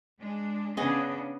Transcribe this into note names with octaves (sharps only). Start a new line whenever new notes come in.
G#3 D4
C#3 B3 C#4 D4 G#4 D#5